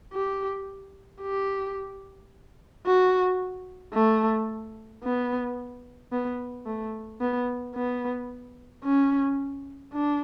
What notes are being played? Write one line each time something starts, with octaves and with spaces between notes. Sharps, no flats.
G4
G4
F#4
A3
B3
B3
A3
B3
B3
C#4
D4